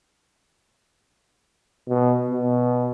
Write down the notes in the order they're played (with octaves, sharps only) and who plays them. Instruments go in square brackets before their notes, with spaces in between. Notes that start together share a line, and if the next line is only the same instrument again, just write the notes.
[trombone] B2
B2